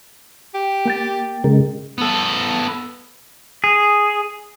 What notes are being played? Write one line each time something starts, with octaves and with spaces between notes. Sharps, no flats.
G4
A#3 G5 A6
C#3 G#3 A#4
B3 A4
G#4